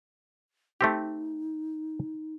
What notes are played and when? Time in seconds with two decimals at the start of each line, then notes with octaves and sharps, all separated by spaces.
0.81 A3 C4 D#4 G4